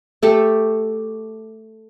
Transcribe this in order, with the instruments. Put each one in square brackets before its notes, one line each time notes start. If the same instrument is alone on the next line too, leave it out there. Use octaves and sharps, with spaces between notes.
[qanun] A3 G4 A4